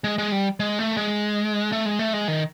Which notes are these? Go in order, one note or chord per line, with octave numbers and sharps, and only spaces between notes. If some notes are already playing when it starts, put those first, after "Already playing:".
G#3
G#3
G3
G#3
A3
G#3
A3
G#3
A3
G#3
D#3